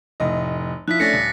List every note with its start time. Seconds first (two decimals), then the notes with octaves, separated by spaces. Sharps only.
0.20 F1 A2 D#5
0.88 F3 E4 F#6 B6
1.00 A3 C#4 D4 A6 A#6 C#7
1.13 D#1